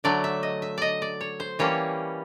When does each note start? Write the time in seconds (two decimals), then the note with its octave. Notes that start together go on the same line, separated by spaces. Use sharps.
0.04 D3 F#3 A3 D5
0.24 E5
0.43 D#5
0.62 E5
0.78 D5 D#5
1.02 D5
1.21 C#5
1.40 C5
1.59 E3 G3 A#3 C#4 C#5